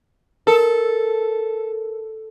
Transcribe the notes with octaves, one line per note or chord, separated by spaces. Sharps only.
A4 A#4